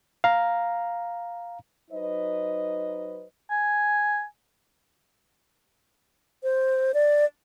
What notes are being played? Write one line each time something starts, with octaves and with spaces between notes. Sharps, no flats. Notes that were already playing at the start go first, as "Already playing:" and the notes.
F5 A#5
F#3 D#4 B4 C5 D#5
G#5
C5
D5